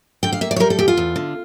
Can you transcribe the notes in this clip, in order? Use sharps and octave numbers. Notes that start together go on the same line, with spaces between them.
D3 G5
F5
A#3 E5
D5
C#5
G3 A#4
A4
E2 G4
F4
E2
D3